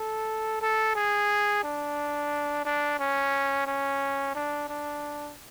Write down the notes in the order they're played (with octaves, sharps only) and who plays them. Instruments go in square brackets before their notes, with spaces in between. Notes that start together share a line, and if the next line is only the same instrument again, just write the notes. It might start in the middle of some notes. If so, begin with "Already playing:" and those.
Already playing: [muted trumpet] A4
A4
G#4
D4
D4
C#4
C#4
D4
D4